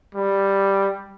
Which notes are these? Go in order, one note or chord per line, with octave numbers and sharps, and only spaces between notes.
G3